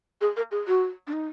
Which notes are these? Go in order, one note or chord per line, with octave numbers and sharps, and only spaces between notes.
G#4
A#4
G#4
F#4
D4
D#4